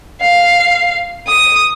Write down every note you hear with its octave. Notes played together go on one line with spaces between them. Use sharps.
F5
D#6